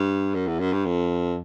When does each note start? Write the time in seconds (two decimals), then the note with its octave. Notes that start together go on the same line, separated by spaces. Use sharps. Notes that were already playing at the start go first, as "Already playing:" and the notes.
Already playing: G2
0.34 F#2
0.47 E2
0.60 F#2
0.72 G2
0.85 F2